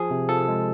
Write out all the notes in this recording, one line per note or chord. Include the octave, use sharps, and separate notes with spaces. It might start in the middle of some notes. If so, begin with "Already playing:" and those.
Already playing: F3 G#4
C3
F3 A4
G#3